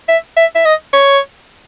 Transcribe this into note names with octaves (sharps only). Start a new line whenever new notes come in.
E5
E5
E5
D#5
C#5